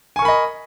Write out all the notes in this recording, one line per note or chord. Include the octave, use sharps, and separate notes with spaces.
A#4 D#5 G#5 B5 C#6